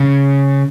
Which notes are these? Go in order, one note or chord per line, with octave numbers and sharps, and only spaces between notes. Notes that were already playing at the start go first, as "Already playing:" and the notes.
Already playing: C#3